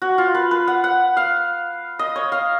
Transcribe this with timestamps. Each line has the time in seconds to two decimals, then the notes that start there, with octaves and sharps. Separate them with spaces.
0.02 F#4
0.18 F4
0.34 B4
0.51 B4
0.68 F#5
0.84 F#5
1.17 F5
1.99 D#5
2.16 C#5
2.32 F5